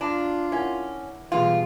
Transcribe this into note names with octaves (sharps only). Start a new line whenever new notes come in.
D4 F4 A#5
C#4 E4 A#4 F#5
B2 E3 G3 G#3 F4